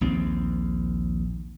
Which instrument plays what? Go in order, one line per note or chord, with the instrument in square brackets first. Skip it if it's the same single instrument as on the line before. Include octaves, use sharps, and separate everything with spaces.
[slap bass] A#1 D#2 C4